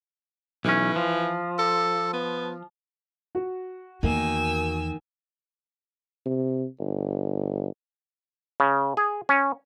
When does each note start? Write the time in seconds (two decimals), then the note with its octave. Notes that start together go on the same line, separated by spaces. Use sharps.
0.65 B1 E3 C#4
0.96 F3
1.59 A4
2.13 B3
3.35 F#4
4.03 E2 D#3 A#3 G#5 E6
6.26 C3
6.80 G1
8.60 C#3
8.97 G#4
9.29 C#4